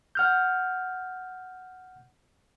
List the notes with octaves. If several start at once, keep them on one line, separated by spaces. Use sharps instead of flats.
F#5 F6 G6